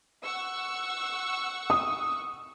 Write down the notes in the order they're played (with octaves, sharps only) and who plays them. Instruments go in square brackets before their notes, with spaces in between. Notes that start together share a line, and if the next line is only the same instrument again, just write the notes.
[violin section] F#5 C#6 E6
[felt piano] D#6